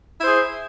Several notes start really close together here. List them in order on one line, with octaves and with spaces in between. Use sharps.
E4 C5 G#4